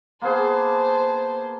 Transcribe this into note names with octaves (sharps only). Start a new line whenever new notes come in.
A#3 B3 G#4 C5 A5